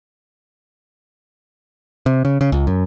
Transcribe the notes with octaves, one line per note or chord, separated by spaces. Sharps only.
C3
C#3
C#3
C#2
F#2